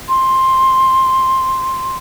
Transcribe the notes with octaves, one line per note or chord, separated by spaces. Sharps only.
C6